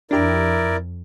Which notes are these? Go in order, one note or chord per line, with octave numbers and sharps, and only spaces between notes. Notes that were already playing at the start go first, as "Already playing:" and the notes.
F2 D4 E4 G4 A#4 D5 A#5